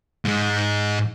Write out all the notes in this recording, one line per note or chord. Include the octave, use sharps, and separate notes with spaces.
G#2 G#3